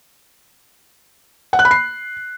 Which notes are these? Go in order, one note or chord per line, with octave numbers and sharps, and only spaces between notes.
F#5
F#6
B5
C7